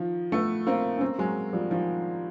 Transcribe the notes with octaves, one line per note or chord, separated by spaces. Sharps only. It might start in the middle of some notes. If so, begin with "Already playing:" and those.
Already playing: D#3 F3
A3 B3
A#3 C4
C#4
A#3 C4
F#3 G#3
F3 G3
D#3 F3